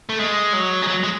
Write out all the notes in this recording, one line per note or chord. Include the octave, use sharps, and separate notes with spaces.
A3
G#3
F#3
G#3
F#3
G#3